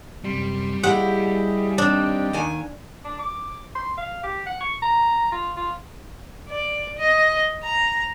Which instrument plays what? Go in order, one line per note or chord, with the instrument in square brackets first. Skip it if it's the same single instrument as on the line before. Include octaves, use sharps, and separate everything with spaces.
[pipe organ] F#2 C3 C6 [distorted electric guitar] G3
[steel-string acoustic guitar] A#2 E4 G4 [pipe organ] G#4 D#5 [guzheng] F#5
[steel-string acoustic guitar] D#2 C4 [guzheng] D4 [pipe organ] D5 D#5 G5
[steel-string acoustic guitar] D#2 D#3 G#5
[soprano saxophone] D4
D6
C6
F5
G4
F#5
C#6
A#5
F4
F4
[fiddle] D5
D#5
A#5